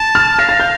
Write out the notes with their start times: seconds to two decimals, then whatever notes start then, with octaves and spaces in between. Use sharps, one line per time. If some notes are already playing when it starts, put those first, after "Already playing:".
Already playing: A5
0.15 F6 A6
0.39 F5 A#6
0.49 A6
0.60 G6